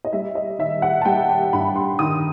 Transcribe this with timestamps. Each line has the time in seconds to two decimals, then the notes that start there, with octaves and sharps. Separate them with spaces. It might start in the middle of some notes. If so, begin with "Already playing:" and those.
0.05 D#5
0.13 G3 E5
0.35 D#5
0.59 D#3 E5
0.82 F#5
1.01 A5
1.05 G3 G5
1.29 G5
1.53 G2 B5
1.76 C6
1.99 D#3 D#6